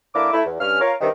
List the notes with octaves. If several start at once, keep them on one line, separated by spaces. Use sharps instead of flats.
D3 A#3 E4 A#4 E5 D6
A3 E4
E2
G2 C#4 F6
F4 A#4 C#5 F5
G2 C3 D#3